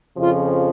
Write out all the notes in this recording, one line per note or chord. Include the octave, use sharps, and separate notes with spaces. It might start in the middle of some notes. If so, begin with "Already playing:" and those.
F2 C#3 F3 F4